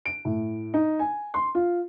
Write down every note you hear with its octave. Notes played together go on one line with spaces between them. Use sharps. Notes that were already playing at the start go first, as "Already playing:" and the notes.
D7
A2
D#4
G#5
C6
F4